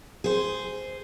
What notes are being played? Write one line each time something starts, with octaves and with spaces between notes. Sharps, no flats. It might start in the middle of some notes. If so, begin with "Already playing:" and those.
G#4 C5